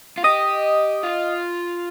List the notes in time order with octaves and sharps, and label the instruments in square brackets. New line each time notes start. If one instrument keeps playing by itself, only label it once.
[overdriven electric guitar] F4
[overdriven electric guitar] G4 [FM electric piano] D#5 D#6
[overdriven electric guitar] F4